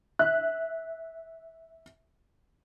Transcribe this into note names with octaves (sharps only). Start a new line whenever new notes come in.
E5 F#6